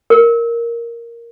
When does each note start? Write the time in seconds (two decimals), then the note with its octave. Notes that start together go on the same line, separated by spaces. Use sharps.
0.10 A#4